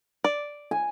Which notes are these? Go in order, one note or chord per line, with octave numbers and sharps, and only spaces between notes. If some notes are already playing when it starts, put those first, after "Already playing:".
D5
G#5